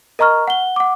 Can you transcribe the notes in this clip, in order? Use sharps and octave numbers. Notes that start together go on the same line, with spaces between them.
A#4 D#5 A#5 C#6 F6
F#5 G7
F#5 D6